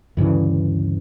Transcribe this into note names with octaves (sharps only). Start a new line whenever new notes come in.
D2 G2 C#3 E3